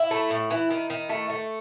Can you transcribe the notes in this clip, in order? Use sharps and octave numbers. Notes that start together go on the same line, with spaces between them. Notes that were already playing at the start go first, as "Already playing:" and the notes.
Already playing: E4
A3
A2
E3
D#3
D#3
A3
A3